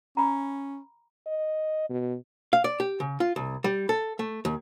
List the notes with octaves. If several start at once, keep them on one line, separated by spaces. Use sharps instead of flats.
C#4 A#5 B5
D#5
B2
F5
D5
G4
C#3
F4
C2
G3
A4
A3
D#2